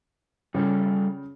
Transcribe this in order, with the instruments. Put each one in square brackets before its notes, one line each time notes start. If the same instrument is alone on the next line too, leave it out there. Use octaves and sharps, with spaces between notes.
[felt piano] C#3 [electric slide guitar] G3 F4 A4